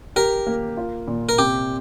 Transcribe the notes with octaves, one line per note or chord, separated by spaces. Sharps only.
G4 A#4
A#3
F4
A#2
A#4
C3 G4